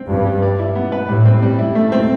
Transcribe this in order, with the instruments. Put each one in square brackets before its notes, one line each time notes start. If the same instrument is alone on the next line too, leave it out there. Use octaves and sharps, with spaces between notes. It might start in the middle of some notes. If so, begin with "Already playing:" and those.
Already playing: [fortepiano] C4
[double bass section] G2 [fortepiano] F3
[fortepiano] G4
D5
E4
B3
B4
[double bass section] A2 [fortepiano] G3
[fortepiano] C4
G3
E4
A3
C4